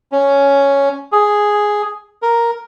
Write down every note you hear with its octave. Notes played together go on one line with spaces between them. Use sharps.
C#4
G#4
A#4